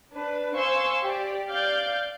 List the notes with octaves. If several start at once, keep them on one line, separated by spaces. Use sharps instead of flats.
D4 B4
C5 F5 G#5 C6 C#6 E6
G4 D5
D5 F5 F6 G6